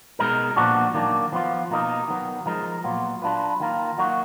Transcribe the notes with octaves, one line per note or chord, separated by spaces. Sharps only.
B2 G#3 D#4 A#4
A#2 F3 B3 D4 F#4
D#3 F#3 A#3 D4
F3 B3 F4
B2 A#3 D#4 A#4
D#3 F#3 B3
F3 G#3 D#4 A#4
A#2 F#3 B3 F4
F#3 D4 F4 B4
D#3 A#3 F4 A#4
F#3 A#3 D#4 F#4